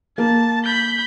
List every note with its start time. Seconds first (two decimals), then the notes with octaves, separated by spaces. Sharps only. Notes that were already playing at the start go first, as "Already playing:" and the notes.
0.18 A#3 A5
0.64 B5 G6